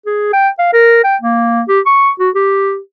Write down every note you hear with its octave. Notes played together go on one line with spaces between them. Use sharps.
G#4
G5
F5
A#4
G5
A#3
G4
C#6
F#4
G4